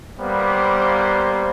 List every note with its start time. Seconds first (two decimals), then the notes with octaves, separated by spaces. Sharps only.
0.18 G3 A#3 B3 C5